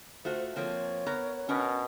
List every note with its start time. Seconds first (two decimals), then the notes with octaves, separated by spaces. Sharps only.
0.25 A3 F4 F#4 C5
0.56 F3 A#3 C4 C#5
1.07 B3 A#4 A#5
1.49 B2 C#4 A#4 B4